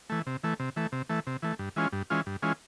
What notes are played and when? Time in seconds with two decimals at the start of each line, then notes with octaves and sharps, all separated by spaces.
0.10 E3 A3
0.27 C3
0.44 E3 A3
0.60 C3
0.76 E3 A3
0.92 C3
1.10 E3 A3
1.27 C3
1.42 E3 A3
1.59 G2
1.76 E3 G#3 C#4 F4
1.92 G2
2.10 E3 G#3 C#4 F4
2.26 G2
2.42 E3 G#3 C#4 F4